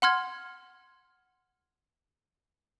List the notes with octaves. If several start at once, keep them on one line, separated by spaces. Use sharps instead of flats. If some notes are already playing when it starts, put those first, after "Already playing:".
F#5 C6 F6 G#6